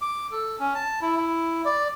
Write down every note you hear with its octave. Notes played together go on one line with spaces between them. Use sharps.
D6
A4
C#4
A5
E4
E4
D5